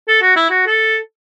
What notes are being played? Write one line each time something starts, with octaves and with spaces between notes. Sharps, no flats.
A4
F#4
E4
F#4
A4